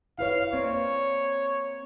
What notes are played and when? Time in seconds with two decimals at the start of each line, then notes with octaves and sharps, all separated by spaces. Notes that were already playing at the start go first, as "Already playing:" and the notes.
0.18 E4 B4 C#5 F5
0.53 A#3 C4 C#5 D5